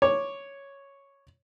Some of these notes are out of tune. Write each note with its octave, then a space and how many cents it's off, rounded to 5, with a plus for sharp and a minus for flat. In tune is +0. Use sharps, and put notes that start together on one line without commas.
C#5 +0 D6 +0